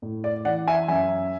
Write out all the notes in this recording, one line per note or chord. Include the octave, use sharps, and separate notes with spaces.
A2
D5
E3 D5 F#5
E5 G#5
F#2 E5 G#5